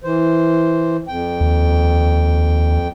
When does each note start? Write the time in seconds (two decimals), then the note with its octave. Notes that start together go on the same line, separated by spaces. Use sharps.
0.04 E3 C5
1.08 F2 G5
1.41 D#2